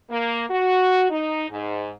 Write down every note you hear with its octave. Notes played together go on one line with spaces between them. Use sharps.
A#3
F#4
D#4
G#2